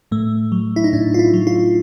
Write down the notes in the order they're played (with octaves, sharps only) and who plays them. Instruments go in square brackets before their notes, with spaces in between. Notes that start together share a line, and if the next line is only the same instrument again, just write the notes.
[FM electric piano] A2 A3
F#3
E4
D#4
A2 D4
F4
E4
F#3
F4